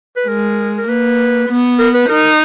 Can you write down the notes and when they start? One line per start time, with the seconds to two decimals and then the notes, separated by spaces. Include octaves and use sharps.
0.16 B4
0.28 G#3 A#4
0.78 A#4
0.88 A#3 B4
1.49 B3
1.79 A#4
1.94 B4
2.09 D#4 A#4